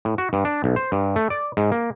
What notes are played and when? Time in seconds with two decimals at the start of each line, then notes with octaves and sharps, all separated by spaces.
0.05 A2
0.18 F#4
0.33 G2
0.45 D4
0.64 B1
0.76 C5
0.92 G2
1.16 A3
1.30 D5
1.57 G#2
1.72 A#3